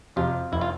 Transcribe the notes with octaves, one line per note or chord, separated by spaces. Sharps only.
F2 C3 F4
F1 E4
F4